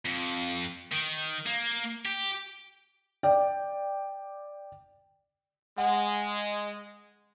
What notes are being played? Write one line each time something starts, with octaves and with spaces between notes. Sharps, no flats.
F2
D#3
A#3
G4
D5 G5
G#3 F#5